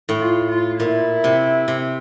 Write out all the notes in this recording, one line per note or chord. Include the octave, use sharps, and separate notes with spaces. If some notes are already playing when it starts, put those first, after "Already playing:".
A2
F4
F4
A#2 E4
C3
C3